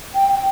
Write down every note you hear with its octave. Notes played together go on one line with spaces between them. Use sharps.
G5
G5